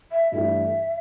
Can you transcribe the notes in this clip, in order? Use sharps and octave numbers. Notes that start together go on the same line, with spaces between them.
E5
G2 E3 A3 D4 G4 E5